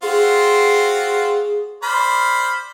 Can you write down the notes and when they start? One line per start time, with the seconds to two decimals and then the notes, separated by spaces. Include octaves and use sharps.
0.03 C4 F4 F#4 G#4
1.83 C5 D5 B5 F6